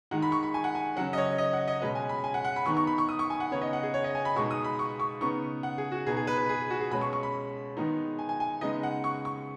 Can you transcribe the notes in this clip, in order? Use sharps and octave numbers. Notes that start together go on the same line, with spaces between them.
D#3 G#3 D#4 F#5
B5
C#6
B5
G#5
F#5
G#5
C#3 F#3 C#4 F#5
D#5
C#5
D#5
F#5
D#5
B2 G#3 C#4 B4
G#5
B5
G#5
F#5
F#5
B5
D#3 B3 D#4 C#6
C#6
B5
C#6
D#6
C#6
G#5
F#5
C#3 B3 D#4 C#5
D#5
F#5
G#4
C#5
D#5
G#5
B5
B2 G#3 B3 D#4 C#6
D#6
B5
C#6
C#6
C#3 B3 D#4 C#6
F#5
G#4
F#4
B2 B3 D#4 G#4
G#4
B4
B4
G#4
G#4
F#4
G#4
B2 G#3 C#4 B5
C#6
C#6
B5
D#3 G#3 B3 D#4
G#5
G#5
G#5
C#3 G#3 B3 D#4 D#5
F#5
C#6
C#6